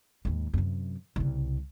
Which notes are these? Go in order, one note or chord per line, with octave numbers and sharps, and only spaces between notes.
D#2 G#2
F#2 C3
C2 C#3